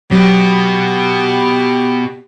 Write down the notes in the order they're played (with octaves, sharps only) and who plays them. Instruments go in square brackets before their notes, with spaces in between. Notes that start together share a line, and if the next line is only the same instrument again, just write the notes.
[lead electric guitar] B2 B3 [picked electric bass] F#3 [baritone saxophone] G4